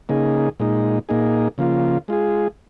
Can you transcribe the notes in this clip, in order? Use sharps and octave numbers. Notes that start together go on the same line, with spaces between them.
C#3 A#3 D#4 G#4
A#2 G#3 D#4
A#2 A#3 D#4 G#4
C#3 F3 A#3 F4
G#3 F4 G#4